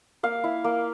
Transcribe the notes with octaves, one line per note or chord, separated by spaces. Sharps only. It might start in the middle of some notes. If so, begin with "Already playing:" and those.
A#3 F5
E4
A#3